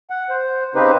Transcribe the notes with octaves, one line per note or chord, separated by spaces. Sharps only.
F#5
C5
C#3 C4 D#4 G4 B4 C5